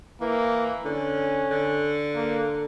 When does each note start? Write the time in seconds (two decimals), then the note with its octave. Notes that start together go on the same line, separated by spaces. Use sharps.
0.21 E3 A#3
0.85 D3 C#4
1.51 D3
2.15 A#3